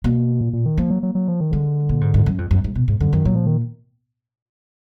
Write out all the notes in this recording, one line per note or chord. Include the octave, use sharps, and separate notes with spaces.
B2 A#3
A#2
A#2
D#3
F3 A#3
F#3
F#3
F#3
F3
D#3
D3 G#3
A#2
G#2
G#2
F#2
F2
F#2
G#2
B2
G#2
F#2 D3
F#2 D#3
A#2 F#3
F3
D#3